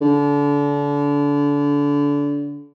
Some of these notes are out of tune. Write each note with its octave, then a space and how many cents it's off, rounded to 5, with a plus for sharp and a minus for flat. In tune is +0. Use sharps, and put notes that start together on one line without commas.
D3 -30